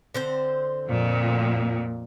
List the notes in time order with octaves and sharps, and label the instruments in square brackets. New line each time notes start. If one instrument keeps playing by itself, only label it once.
[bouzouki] D3 C4 C5
[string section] F2 A#2